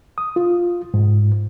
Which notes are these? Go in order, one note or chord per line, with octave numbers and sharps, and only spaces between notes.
D#6
F4
G#2